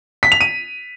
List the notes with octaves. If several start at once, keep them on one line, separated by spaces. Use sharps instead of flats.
B6
F7
D#7